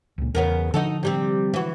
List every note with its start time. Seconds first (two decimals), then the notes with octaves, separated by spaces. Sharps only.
0.18 C#2 A#2
0.35 E2 C#3 B3 A#4
0.74 D3 F3 D#4 F#4 A4
1.03 C3 G3 C4
1.54 E3 F#4